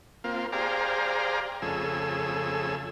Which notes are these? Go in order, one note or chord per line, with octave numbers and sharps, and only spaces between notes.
A#3 C4 F4
G4 G#4 C5 D5 F5 A#5
F2 C#3 A3 G#4 E6